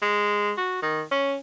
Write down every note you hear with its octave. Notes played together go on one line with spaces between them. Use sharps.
G#3
F#4
D#3
C#4